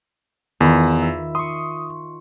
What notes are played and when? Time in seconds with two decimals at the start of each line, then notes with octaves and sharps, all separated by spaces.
0.60 E2 D#3 F4 B5
1.02 E5
1.35 C6 C#6 D#6